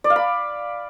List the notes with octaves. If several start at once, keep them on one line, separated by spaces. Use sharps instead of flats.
D5
F5
B5